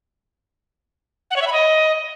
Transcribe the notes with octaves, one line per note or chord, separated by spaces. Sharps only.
F#5
C#5
E5
B5
D#5